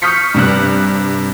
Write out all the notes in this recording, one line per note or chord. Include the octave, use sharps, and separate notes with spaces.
C#6 D#6 F6 G6 B6 C#7
G2 C3 F#6